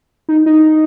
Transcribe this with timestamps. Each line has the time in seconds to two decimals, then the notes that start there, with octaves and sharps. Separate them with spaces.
0.29 D#4
0.46 D#4